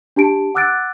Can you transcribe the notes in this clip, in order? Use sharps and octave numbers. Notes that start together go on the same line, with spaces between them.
D4 G4 A5 D7
F#5 D6 E6 F#6 A6 D7